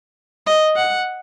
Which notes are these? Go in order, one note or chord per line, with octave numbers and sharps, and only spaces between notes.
D#5
F#5